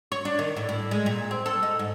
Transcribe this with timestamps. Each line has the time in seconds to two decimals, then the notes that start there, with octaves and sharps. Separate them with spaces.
0.12 C#5
0.25 D4
0.39 D#3
0.57 A2
0.69 A2
0.91 G#3
1.06 A#2
1.31 C4
1.46 A4
1.63 D#4
1.79 G#2